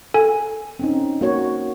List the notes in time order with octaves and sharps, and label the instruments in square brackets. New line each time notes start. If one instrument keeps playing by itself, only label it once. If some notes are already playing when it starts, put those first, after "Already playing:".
[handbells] A4 G#5
[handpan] C4 C#4 D#4
A#3 F#4 C#5